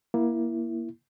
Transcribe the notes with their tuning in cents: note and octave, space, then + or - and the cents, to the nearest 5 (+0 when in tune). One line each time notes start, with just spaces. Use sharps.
A#3 +20 E4 +10